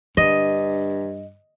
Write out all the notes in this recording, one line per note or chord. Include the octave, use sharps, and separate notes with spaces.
G2 D3 D#5